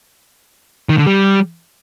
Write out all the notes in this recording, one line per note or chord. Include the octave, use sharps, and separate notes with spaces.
D#3
D3
G3